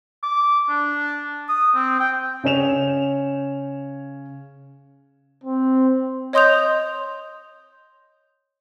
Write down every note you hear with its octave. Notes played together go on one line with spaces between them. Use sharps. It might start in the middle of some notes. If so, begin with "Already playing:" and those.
D6
D4
D#6
C4
G5
C#3 C#4 C#5 E7 F7
C4
C#5 D#5 C6 D#6 G6 F7